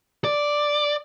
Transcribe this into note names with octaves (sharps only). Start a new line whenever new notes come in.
D5